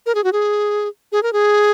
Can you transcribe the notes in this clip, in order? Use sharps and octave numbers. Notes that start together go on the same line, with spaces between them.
A#4
G#4
F#4
G#4
G#4
A#4
G#4